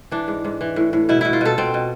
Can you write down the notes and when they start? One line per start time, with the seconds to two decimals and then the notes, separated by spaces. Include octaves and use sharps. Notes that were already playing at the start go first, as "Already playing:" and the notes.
0.11 E3 D4
0.28 G#2
0.44 G#2
0.61 E3
0.76 A2
0.93 A2
1.09 B2 E4
1.21 B2 E4
1.33 F4
1.41 B2 A4
1.58 B2 C4
1.74 B2